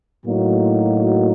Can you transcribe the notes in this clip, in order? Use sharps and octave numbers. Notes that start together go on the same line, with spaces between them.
A2 F#3 A#3 D#4 F#4